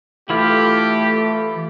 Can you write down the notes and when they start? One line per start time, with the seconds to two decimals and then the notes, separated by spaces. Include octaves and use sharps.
0.30 E3 A3 E4 F4 G4